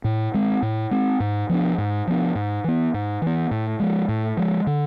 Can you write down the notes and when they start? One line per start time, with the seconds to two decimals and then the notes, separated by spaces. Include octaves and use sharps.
0.04 A2
0.34 G#3 C4
0.62 A2
0.91 G#3 C4
1.20 G#2
1.49 F3 B3 D4
1.78 G#2
2.07 F3 B3 D4
2.35 G#2
2.64 E3 B3
2.94 G#2
3.22 E3 B3
3.51 A2
3.80 F3 G#3
4.09 A2
4.37 F3 G#3
4.67 D3